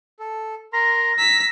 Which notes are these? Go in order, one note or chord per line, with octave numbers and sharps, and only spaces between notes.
A4
A#4 A#5 C6 A#6
A#5 E6 B6